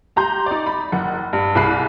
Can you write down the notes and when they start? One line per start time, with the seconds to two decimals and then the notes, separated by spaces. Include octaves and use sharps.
0.16 G4 A#5 C6 G6
0.46 D#4 D5
0.66 B5
0.92 F#1 F#5
1.33 G2
1.55 C2 G#4 E5 B5 F#6 C7